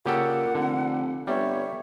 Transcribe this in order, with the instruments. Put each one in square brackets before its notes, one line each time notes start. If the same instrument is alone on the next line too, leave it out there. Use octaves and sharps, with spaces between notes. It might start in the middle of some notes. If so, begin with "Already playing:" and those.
[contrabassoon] A#2 [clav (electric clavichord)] C#3 G4 A4 [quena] F#5
[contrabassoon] F1 [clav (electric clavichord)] D3
[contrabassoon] G1 [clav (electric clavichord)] G3 [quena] C#5 [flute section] E5